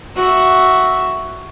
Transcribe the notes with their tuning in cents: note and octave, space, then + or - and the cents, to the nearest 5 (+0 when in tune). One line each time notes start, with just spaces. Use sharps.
F#4 +5 E5 +0